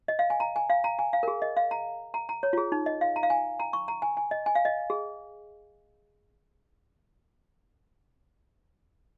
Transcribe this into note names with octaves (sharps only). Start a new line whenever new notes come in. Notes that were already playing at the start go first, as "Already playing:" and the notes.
D#5
F5
G#5
A#5
G#5
F5
A#5
G#5
F5
A#4
G#4
D#5
F5
A#5
A#5
A#5
C#5
F4
G#4
D#4
D#5
F5
A#5
F5
G#5
A#5
C#6
A#5
G#5
G#5
D#5
G#5
F5
D#5
G#4